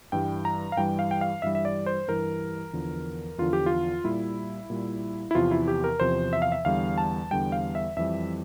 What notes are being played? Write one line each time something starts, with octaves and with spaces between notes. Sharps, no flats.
G2 E3 G3 G5
A#5
F5
G2 E3 G3 G5
F5
G5
F5
G2 E3 G3 E5
E5
D5
C5
G2 E3 G3 A#4
E2 D3 F3
E2 D3 F3 F4
G4
F4
A#2 G3 E4
A#2 G3
E4
E2 C3 F3 F4
E4
G4
A#4
E2 C3 F3 C5
E5
F5
E5
E2 D3 G3 F5
A5
E2 D3 G3 G5
F5
E5
F2 E3 G3 E5